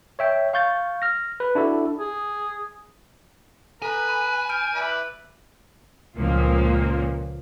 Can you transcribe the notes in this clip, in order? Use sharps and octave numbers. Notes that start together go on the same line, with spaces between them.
C#5 E5 G5
F5 C#6 G6 A6
F6 A#6
B4
D4 E4 F#4 A4
G#4
A4 B4 G#5 A#5
B5
F6 G6 D7
E4 B4 D5
C#2 A#2 F3 A#3